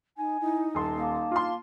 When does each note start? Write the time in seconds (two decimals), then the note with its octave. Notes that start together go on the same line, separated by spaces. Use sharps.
0.18 D#4 G#5
0.41 D#4 E4
0.75 D#1 A5 C6
0.97 A#3
1.31 F4 C6